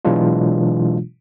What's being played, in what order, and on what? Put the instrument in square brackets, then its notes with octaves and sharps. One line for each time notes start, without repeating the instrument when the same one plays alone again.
[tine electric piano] B2 E3 F#3 G#3 D4 F4